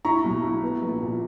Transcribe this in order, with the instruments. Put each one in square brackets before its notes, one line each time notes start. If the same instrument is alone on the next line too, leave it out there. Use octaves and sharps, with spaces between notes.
[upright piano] E4 [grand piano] A#5 C#6
[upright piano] B1
E4
B3
A#1
A#2